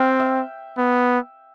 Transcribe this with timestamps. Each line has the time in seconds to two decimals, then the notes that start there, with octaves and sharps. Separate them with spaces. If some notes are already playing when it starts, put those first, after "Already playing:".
Already playing: C4 F5 G5
0.20 E5
0.78 B3